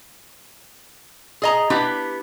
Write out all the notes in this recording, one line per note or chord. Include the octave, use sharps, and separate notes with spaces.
G#4 D#5 A#5
B3 D4 E4 G4